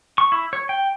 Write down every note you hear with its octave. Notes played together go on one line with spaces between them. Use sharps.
C#6
E4
C#5
G5